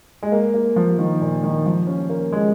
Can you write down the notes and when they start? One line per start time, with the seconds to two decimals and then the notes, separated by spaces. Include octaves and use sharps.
0.23 G#3
0.32 A#3
0.54 A#3
0.76 F3
0.98 D#3
1.21 A#2
1.43 D#3
1.66 F3
1.87 C#4
2.09 A#3
2.33 G#3